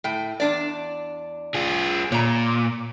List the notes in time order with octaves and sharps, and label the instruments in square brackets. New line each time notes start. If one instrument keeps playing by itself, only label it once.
[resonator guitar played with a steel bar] A2 G5
E2 D4 D5
[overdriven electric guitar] F4 G#4
[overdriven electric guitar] A#2 [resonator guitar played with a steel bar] C#5 A#5